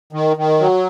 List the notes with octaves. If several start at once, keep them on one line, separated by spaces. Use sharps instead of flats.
D#3
D#3
F#3